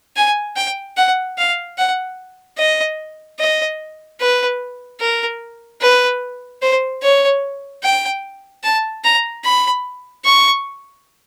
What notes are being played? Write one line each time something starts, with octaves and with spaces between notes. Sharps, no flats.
G#5
G5
F#5
F5
F#5
D#5
D#5
B4
A#4
B4
C5
C#5
G5
A5
A#5
B5
C#6